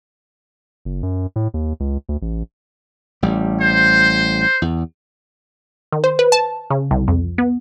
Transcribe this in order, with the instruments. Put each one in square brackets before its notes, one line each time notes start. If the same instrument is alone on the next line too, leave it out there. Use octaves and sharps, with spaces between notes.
[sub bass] F#1
F#2
A2
D#2
C#2
D2
A1
[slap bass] A1 G3
[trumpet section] C5
[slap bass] E2
[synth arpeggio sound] D#3
C5
B4
A5
C#3
C2
F2
B3